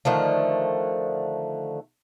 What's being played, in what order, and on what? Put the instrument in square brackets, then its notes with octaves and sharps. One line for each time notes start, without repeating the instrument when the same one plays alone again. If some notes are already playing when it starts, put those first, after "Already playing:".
[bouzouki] D3 D#3 F3 A3